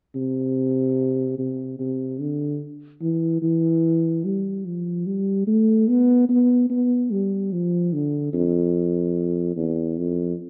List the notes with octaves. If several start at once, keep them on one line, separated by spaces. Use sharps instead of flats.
C3
C3
C3
D3
E3
E3
G3
F3
G3
A3
B3
B3
B3
G3
F3
D3
F2
E2
F2